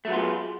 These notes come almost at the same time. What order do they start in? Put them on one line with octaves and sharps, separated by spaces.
A3 F#3 B3 F4 G#3